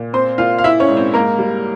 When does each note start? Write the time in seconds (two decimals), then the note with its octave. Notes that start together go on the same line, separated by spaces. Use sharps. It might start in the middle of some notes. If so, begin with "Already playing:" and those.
Already playing: A#2
0.13 C4 C5 C6
0.38 A#2 F4 F5
0.58 F5
0.64 E4 E5
0.80 C#4 C#5
0.88 G#2
0.97 C4 C5
1.14 G#2 A#3 A#4
1.39 G3